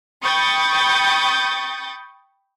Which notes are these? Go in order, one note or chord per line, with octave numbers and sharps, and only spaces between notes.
G5 B5 C#6 D#6 G6 A6